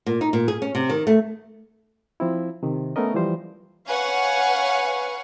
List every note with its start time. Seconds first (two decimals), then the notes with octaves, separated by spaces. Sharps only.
0.06 A#2
0.21 D#4
0.33 A#2
0.48 G#4
0.62 C#4
0.75 C3
0.90 D#3
1.07 A3
2.20 F3 C4 E4
2.63 C3 D#3
2.96 A3 B3 C#4 A#4 D#5
3.14 E3 F3 G3 C5
3.88 B4 C#5 F5 F#5 G#5 C#6